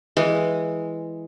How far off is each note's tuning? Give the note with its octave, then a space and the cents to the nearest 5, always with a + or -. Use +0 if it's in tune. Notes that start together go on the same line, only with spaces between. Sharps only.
E3 +0 G#3 +0